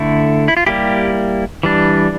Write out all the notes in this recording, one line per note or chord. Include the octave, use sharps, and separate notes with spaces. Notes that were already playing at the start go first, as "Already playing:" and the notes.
Already playing: D3 A3 E4
E4
F4
G3 A#3 E4 G4
E3 G3 D4